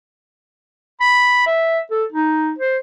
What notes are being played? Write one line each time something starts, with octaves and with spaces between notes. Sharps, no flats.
B5
E5
A4
D#4
C5